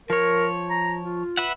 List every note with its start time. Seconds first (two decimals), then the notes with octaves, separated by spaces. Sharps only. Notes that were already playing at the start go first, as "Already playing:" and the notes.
0.10 F3 A#4 C#5
0.70 A#5
1.02 F4
1.37 B4 E5 F#5